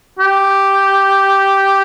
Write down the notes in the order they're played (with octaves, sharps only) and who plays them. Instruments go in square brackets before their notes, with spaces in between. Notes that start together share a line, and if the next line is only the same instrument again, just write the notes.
[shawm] G4